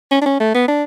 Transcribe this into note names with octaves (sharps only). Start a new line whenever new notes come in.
C#4
D4
C#4
A3
B3
D4